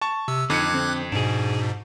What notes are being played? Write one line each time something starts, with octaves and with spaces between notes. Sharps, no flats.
A5 C#6
C3 E6
F2 D3 D#4 D6 F#6 G#6 C#7
D3 C4
G#2 B2 D4 G#4